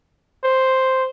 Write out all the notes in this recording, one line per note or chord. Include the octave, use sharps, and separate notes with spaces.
C5